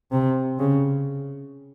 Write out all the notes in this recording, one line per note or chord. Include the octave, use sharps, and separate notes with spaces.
C3
C#3